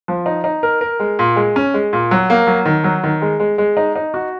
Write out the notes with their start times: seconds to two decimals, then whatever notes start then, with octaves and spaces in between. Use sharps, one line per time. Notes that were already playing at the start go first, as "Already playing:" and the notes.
0.08 F3
0.26 D#4
0.44 D#4
0.63 A#4
0.81 A#4
1.00 G#3
1.19 A#2
1.36 G#3
1.56 C#4
1.74 G#3
1.93 A#2
2.11 F#3
2.30 A#3
2.47 F#3
2.65 D#3
2.84 F#3
3.04 D#3
3.22 G#3
3.40 G#3
3.58 G#3
3.77 D#4
3.96 D#4
4.14 F#4